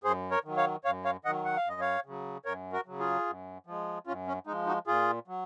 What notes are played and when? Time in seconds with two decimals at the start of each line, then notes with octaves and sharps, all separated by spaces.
0.04 F#2 G#4 C5
0.31 A#4 C#5
0.44 D#3 F#3
0.57 C#5 F5
0.84 F#2 C#5 F5
1.04 C#5 F5
1.25 D#3 D#5 F#5
1.28 F#3
1.45 F#5
1.57 F5
1.65 F#2 D#5
1.81 C#5 F5
2.06 C#3 F#3
2.45 F#2 A#4 C#5
2.73 F#4 A#4
2.86 C#3 F#3
2.99 F4 G#4
3.26 F#2
3.66 F3 G#3
4.07 F#2 C#4 F4
4.27 C#4
4.47 G#3 D#4
4.51 F3
4.67 D#4 F#4
4.87 A#2 F4 G#4
5.27 F#3